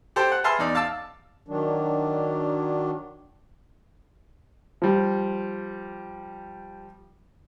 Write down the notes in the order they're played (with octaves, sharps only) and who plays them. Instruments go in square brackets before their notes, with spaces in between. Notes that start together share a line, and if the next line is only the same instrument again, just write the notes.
[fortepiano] G4 A4 C5 G5
F#5
G#4 B4 E5 A5 C6 F6
E2 D#4 D5
F5 A5 D6 E6
[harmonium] D#3 F#3 D4
[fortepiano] F3 G3